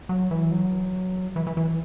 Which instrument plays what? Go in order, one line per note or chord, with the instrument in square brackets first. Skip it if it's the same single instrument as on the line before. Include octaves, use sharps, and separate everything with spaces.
[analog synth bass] F#3
E3
F#3
E3
E3
E3